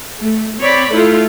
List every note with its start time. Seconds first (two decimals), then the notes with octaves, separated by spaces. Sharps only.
0.20 A3
0.60 C4 C#5 D5 B5
0.92 A3 E4 F4